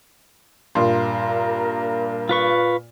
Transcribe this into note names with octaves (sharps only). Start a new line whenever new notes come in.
G2 A#2 A#4 C6
F4 B4 C#6